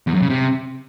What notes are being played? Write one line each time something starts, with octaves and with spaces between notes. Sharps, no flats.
E2
F#2
C#3
C3